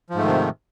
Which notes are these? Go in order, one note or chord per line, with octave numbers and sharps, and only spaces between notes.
G#2 C3 D#3 F3 A3